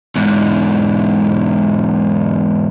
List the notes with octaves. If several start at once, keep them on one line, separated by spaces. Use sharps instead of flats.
E2 G#2